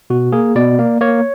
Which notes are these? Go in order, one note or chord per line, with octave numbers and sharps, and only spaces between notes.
B2 F#4
A#3 G#4
B2 D5
A#3
A#3 C#5